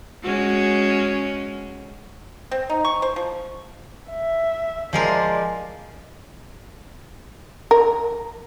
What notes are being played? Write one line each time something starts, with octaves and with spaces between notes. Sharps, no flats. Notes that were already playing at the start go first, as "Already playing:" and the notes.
G#3 C#4 F#4
C4
D#4
C#6
C5
F3
E5
F3 G#3 A#4 D5
A#4